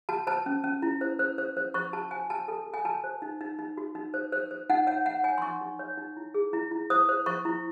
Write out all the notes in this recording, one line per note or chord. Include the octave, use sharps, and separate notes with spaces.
F#4 A5
C5 A5
C#4
C#4
E4
C5
C5
C5
C5
C5 C#6
F#4 A5
C5 G#5
F#4 A5
A4 A5
A4
G#5
F#4 A5
C5
D#4
D#4
D#4
F#4
D#4
C5
C5
C5
D#4 F#5
C#5 F#5
D#4 F#5
C#5 G#5
C6
D#4 C#6
D#4
C#5
D#4
E4
G#4
E4
E4
C5 D#6
C5
C5 C#6
E4